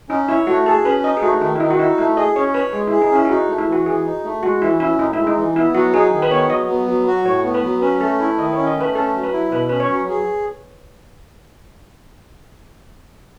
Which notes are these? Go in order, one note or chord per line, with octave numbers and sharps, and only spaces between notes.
C#4 D#4
E4 C#5
A3 F#4
G#4 A4
C#4 B4
D#4 D#5
G#4
A3 F#4
D#3 D#4
E4
D#3 D#4
F#4
D#4 E4
A3 E4
G#4 D#5
C#4 C#5
B4 C#5
G#3 G#4
E4 G#4
D#4
C#4 E4
G#4
D#4 F#4
A3
E4
E3 F#4
E3 G#4
D#4
A3
G#3 F#4
E3 E4
C#4 E4
A2 D#4
G#3 E4
D#4
E3
B3 E4
F#3 F#4
D#4 G#4
D#3
B4
B3 C#5
F#3 D#5
B3
F#3
F#4
A2 C#5
B3
B4
F#3
C#4 B4
A3 A4
E4 A4
D#3 D#5
C#4 C#5
D#5
A3 B4
C#4 A4
F#3
B4
E4
B2 B4
C#4 B4
C#5
F#3
G#4